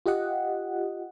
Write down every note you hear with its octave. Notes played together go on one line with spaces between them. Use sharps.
F4 G4 D#5 F#5